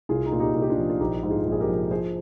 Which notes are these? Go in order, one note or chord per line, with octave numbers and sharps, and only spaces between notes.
C2 F4 G#4
D#4
A#2 F4
D#4 G4
C2
G4
D4 F4
F3
F4
A#1 D#4 G4
G#2
F4 G#4
A#1
G#4
G4 A#4
F3
F3 G#4 C5